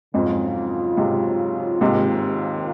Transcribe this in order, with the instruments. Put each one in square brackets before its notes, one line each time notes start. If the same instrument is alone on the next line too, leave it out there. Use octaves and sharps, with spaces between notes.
[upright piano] F2 G#2 [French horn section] C#3 F#3 C#4 F4
[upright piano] G#2 C3
[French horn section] D#2 D#3 A#3 F4 [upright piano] G#2 C3